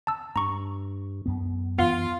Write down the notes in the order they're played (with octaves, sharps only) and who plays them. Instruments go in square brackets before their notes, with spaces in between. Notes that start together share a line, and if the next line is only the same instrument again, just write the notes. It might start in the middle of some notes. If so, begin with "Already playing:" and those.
[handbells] A5 E6
[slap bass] G2 [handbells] A#5 C#6
[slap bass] F#2 B3
[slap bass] F#2 E3 [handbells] B3 F#5 C7 [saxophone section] F4